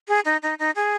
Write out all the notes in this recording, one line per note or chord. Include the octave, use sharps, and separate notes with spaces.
G#4
D#4
D#4
D#4
G#4